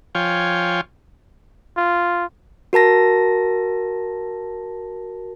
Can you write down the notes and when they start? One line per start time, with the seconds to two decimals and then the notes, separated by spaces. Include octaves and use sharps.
0.15 F3 F4 C#5 G5 G#5
1.77 F4
2.73 F#4 A#4 A5 A#6